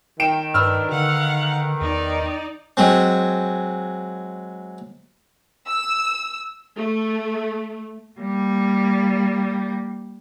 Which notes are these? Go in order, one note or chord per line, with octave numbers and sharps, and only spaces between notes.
D#3 G5 D7 E7
G2 D4 B4 E6 F6
D3 F5 F#5
E2 D#4 D5
F#3 G#3 C4
E6
A3
G3 A#3